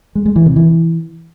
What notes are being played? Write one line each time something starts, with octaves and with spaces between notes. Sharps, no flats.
G#3
G#3
E3
C3
E3